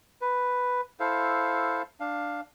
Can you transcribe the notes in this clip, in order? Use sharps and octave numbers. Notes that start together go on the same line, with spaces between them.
B4
E4 A4 C5 F5
D4 F5